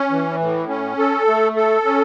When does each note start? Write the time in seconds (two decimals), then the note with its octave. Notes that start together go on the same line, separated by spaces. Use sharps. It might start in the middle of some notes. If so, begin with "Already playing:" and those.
Already playing: C#4
0.11 E3
0.40 A2
0.69 C#4
0.98 A4
1.27 A3
1.56 A4
1.85 C#4